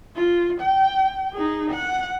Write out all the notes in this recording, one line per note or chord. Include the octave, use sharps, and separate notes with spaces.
F4
G5
D#4 G#4
F#5